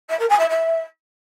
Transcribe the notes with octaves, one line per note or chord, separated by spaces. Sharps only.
E5
A#4
G#5
E5
E5